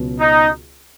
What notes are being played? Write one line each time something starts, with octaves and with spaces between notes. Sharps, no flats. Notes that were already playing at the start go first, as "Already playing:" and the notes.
Already playing: C#2 B2 F#3
D#4